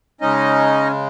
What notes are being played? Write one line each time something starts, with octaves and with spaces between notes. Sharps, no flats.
C#3 G#3 C#4 D#4 D#5